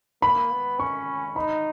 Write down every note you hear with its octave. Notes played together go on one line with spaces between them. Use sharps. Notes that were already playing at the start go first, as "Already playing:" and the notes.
A#3 B5
B3
C#4 C#6
D#4 B5